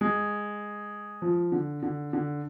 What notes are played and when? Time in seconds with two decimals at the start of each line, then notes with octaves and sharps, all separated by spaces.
0.01 G#3
1.22 F3
1.52 D3
1.83 D3
2.13 D3